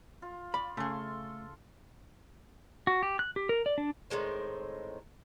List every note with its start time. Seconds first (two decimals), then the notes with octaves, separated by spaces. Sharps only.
0.22 F4
0.54 F4 D5 B5
0.77 C#3 A3 G#4 A4 C6 C#6
2.87 F#4
3.03 G4
3.19 F#6
3.36 G4
3.49 A#4
3.66 D5
3.78 D4
4.10 A2 D#3 G#3 C4